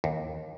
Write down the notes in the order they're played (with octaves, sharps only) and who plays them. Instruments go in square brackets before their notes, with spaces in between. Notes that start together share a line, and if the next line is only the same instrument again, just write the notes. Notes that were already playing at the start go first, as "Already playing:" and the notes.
[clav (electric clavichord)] D#2